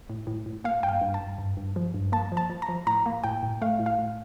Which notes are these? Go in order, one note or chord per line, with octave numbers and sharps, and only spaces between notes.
A2
A2
A2
A#3 F5
G2 G5
F5
G2
A5
G2
G2
G2
F3
G2
A#3 A5
F3
A5
F3
A#5
F3
A2 A#5
A#3
A2 G5
A2
A3 F5
A2
F5
A2